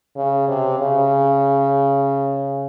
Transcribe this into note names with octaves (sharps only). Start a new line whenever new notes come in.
C#3
C3
C#3